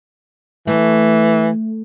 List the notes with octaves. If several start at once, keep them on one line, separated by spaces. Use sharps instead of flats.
E3 A3